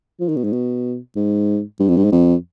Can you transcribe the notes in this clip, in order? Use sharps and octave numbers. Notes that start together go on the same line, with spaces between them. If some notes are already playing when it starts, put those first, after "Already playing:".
F3
D#3
B2
G#2
B2
G#2
G2
F2
G2
G#2
F2